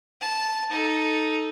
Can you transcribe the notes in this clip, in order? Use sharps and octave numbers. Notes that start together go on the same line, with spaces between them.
A5
D#4 A4